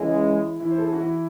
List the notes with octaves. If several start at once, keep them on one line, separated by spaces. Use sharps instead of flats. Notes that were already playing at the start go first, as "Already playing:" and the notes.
Already playing: C#2 C#3 E3 G#3 E4
E3 E4
C5
A4
G#4
F#4
E3 E4